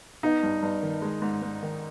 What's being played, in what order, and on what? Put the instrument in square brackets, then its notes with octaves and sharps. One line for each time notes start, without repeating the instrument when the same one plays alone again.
[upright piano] B3 [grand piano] D#4
[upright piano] G2
G2
D#3
G#3
G#2
G#2
D#3